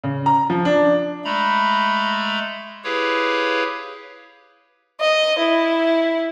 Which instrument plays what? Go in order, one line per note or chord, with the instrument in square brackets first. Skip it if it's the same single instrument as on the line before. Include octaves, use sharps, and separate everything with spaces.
[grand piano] C#3
A#5
F3
D4
[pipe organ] G#3 A3 A#5 B5
E4 G4 G#4 B4 C#5 F5
[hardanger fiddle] D#5
E4